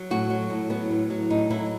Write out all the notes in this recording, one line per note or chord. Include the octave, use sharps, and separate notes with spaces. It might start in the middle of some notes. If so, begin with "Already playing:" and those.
Already playing: F#3
A2 F#4
F#3
A2
F#3 B3
A2
F#3
A2 D#4
F#3 E4